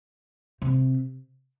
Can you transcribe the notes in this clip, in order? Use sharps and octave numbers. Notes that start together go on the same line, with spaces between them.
C3